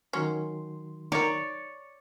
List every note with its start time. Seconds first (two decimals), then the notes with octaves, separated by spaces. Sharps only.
0.13 D#3 F#3 C#4 C6
1.12 D#4 A#4 C#5 D5